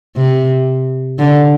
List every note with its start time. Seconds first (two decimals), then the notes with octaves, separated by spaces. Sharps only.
0.17 C3
1.19 D3